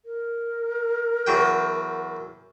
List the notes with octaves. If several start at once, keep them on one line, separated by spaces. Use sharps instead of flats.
A#4
E2 F#3 G5